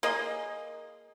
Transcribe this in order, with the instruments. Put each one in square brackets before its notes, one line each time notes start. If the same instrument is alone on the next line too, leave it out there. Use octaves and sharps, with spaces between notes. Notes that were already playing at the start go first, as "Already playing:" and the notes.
[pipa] A#3 G#4 D#5